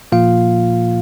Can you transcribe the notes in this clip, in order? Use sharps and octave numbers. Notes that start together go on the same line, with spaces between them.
A#2 F3 A#3 F4 F5